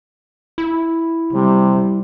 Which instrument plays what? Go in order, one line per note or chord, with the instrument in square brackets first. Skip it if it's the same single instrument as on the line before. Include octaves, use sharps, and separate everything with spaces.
[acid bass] E4
[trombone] C3 [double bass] G3